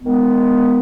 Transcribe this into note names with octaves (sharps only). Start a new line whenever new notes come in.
D#3 G#3 B3